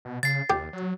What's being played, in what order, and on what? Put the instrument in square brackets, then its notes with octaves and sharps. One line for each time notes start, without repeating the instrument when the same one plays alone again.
[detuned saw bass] B2
[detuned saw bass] C#3 [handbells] A6 C7
[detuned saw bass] D#2 [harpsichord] G4
[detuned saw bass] F#3